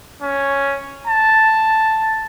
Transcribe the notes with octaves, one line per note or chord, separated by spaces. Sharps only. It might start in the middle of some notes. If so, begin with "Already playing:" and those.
C#4
A5